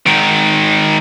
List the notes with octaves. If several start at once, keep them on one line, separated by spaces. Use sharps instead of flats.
G#2 D#3